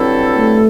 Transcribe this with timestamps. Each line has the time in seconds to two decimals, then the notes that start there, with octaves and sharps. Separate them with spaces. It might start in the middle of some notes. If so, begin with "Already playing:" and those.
Already playing: G2 F#3 C4 E4 A4
0.37 A3